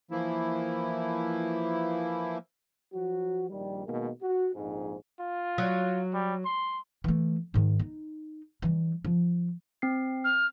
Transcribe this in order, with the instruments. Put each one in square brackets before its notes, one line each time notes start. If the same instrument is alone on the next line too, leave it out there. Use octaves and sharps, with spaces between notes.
[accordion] E3 F3 A#3 E4
[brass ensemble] F3 F#3 F#4
A#1 D#3 G3
B2 D#3 G#3 A#3
F#4
A#1 F2 G#2
[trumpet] F4
[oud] F#3
[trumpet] G3
C6
[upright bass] E3 A3
G#2 D#3
D#4
E3 G3
F3
[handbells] C4 C7
[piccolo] F6